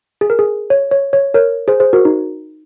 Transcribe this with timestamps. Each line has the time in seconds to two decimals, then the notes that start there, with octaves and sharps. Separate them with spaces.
0.21 G#4
0.30 A#4
0.39 G#4
0.70 C#5
0.91 C#5
1.13 C#5
1.34 A#4 C#5
1.68 G#4 C5
1.80 G#4 C5
1.93 F#4 A#4
2.05 D#4